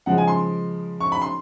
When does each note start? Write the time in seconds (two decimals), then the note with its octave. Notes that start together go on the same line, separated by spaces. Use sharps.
0.06 C#3 F3 G#3 F#5
0.18 G#5
0.28 C6
1.00 C#6
1.12 B5
1.22 C6